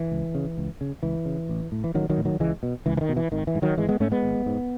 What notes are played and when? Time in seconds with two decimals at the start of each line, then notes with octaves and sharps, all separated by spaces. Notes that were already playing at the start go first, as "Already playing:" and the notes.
Already playing: E3
0.12 C#2
0.35 C#3
0.58 C#2
0.81 C#3
1.03 C#2 E3
1.26 C#3
1.49 A1
1.72 A2
1.84 E3
1.94 A1 D#3 F#3
2.10 D#3 F#3
2.17 A2
2.25 D#3 F#3
2.40 C#2 E3 G#3
2.63 B2
2.86 C#2 E3
2.97 E3
3.01 D#3
3.09 B2
3.17 E3
3.32 G#1 D#3
3.47 E3
3.55 G#2
3.62 D#3 F#3
3.77 G#1 E3 G#3
3.89 G#3 B3
4.00 G#2 A3 C#4
4.12 G#3 B3
4.23 G#1
4.46 G#2